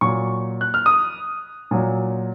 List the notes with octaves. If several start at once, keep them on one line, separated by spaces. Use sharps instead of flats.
A#2 F#3 C#6
F#6
F6
D#6
A#2 F#3